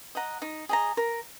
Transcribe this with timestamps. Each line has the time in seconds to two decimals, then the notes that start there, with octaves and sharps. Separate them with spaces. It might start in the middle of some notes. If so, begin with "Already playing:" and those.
0.15 D#5 F#5 A#5
0.42 D#4
0.69 G#4 D#5 A#5
0.97 A#4